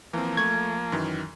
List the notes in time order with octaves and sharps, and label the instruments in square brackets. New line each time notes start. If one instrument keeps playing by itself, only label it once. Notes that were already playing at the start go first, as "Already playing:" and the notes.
[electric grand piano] E3 C4 [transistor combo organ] F3 A#3
[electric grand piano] A3 C#6 [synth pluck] G#6
[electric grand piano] F#2 D#3 E3